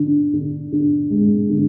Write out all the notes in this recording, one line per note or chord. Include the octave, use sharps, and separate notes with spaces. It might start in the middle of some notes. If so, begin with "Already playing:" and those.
Already playing: D3 D4
D3
D3
G#3
D3